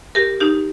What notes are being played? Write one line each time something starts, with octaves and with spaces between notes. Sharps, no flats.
G4 A#4
D#4 G4